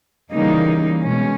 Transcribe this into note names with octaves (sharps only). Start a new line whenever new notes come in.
C#3 E3 G3 A#3 D#4
B2 G#3 C#4